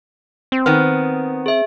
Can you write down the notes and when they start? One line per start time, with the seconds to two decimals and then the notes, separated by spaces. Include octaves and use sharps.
0.52 C4
0.66 D#3 B3 F6
1.46 G#4 E5